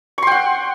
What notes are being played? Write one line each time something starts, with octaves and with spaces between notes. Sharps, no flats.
F#5 G5 C6 C#6